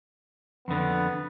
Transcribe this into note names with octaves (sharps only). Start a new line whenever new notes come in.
F2 D3 B3